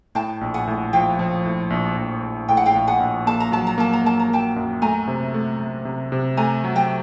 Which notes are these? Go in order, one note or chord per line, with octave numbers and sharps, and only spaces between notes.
A2 G5 A5
A#1
F#5 G#5
A2
F3 F5 G5
F3
A2
A#1
A#1
A#1
A2 G5
F#5
F5 G5
A#1
F#5 G#5
A#1
A#3 A5
A#5
F#3 A5
A#5
A#3 A5
A#5
A#3 A5
A#5
A#3 G5 A5
F#2
A3 G#5 A#5
C3
A3
A3
C3
C3
A3 G#5 A#5
F#3
G5 A5